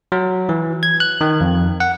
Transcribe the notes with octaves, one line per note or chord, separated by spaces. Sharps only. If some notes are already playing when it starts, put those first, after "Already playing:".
F#3
E3
G#6
F#6
D#3
F2
F#5